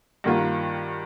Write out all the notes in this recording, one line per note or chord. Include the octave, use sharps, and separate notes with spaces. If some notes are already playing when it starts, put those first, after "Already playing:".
G2 D#3 A#3 F4